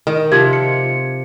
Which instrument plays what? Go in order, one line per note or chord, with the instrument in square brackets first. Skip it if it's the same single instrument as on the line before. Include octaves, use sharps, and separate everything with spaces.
[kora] D#3
[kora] C3 F3 [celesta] G#6
[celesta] C#7